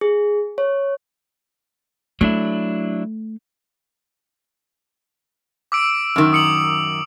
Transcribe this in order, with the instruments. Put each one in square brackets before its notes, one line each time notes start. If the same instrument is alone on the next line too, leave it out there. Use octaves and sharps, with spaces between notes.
[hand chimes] G#4
C#5
[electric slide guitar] F#3 D4 E4 [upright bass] A3
[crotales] D6 E6 D7
[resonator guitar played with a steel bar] F#2 D#3
[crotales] D#6 C#7 F#7